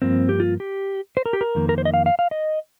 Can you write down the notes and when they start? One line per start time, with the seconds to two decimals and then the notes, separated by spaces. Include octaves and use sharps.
0.02 G2 F3 A#3 C4
0.29 G4
0.40 F4
0.60 G4
1.17 C5
1.26 A#4
1.33 G4
1.41 A#4
1.55 F2 D#3 A#3
1.69 A#4
1.78 C5
1.85 D#5
1.94 F5
2.06 F5
2.19 F5
2.31 D#5